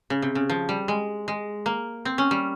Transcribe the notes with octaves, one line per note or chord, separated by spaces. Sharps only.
C#3
C3
C#3
F3
G3
G#3
G#3
A#3
C4
C#4
G3